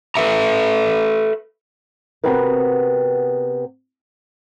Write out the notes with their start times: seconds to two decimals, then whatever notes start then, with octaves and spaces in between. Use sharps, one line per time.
0.15 A4 B4 C#5 E5 A#5
2.24 C3 B3 C4 F#4 A#4 B4